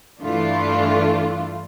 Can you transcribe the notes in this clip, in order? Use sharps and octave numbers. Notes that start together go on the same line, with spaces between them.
G2 E3 A3 D4 F4